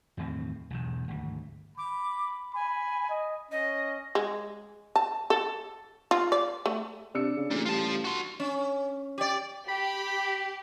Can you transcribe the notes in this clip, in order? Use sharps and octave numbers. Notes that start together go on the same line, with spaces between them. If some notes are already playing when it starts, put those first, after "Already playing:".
E2 A2 D#3 C4
B1 E2 G#2
G#1 D2
B5 D6
G#5 B5
D#5
C#4 D#5
G#3
A5
A4
F4
D5
A3
C3 D4 E6 C#7
C#3
A1 A#2
G3 F4 G4 A5
F#4 C6
C#4
G4 D5
G4 B5